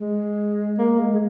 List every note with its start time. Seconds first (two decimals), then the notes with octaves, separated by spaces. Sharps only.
0.01 G#3
0.78 A#3
0.99 G#3
1.14 G#3